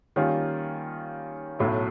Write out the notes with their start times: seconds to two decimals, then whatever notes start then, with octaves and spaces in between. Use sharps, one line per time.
0.16 D#3 G3 A#3 C#4 F4
1.59 B1 A2 F#3 A3